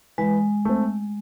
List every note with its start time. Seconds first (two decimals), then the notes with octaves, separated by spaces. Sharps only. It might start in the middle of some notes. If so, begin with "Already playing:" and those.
0.18 E3 G#3
0.65 A3 C4